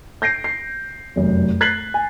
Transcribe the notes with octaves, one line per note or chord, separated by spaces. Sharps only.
G6 A#6 C7 D7
C7
F1 F#2
F#6 G#6 A6 B6 C7 F#7
G#5